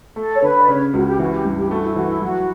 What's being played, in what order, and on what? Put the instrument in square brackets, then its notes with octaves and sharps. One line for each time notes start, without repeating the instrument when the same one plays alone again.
[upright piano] A3 [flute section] A4
[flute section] C#5
[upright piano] D3 [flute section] B4
[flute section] D5
[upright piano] C#3 [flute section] C#5
[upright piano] C#2 [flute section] F#4
[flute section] G4
[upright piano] E3 [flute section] F#4
[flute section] G4
[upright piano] G2
[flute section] G4
[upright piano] A3 [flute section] F#4
[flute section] E4
[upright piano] E3 [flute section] F#4
[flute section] E4
[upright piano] F#3 [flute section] F#4